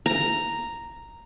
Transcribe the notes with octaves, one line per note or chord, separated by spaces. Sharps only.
A#5